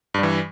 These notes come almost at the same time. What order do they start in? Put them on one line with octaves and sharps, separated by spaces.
G2 G3 E3